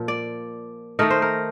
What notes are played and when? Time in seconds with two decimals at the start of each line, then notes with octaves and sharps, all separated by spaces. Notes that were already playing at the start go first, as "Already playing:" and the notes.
Already playing: A#2 F3
0.08 D5
0.99 D#3 A3 D#4 A#4
1.10 C5
1.22 A#4